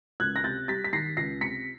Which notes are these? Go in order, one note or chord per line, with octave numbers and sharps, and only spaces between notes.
C#2 F#6 G#6
A#6
C3 G6 A6
G3 A6 B6
B6
D#3 A#6 C7
C#2 A#6 C7
C3 B6 C#7